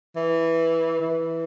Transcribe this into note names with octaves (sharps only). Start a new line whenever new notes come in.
E3
E3